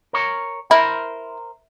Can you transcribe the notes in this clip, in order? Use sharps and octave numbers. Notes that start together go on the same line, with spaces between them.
A#4 C#5
E4 A#4 C5